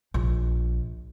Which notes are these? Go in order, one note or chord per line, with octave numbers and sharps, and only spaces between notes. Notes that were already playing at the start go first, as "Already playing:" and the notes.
A#1